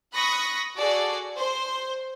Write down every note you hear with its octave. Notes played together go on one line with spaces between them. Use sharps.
B5 C#6 D#6 F#6 A#6
F#4 G#4 A4 D5
C5